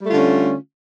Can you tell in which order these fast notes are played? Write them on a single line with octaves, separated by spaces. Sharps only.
G3 A3 F4 D3 C#4